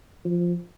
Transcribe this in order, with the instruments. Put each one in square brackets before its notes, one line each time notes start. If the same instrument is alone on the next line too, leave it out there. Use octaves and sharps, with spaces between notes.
[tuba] F3